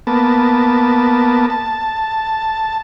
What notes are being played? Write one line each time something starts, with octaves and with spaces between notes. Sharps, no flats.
A#3 B3 A5
A5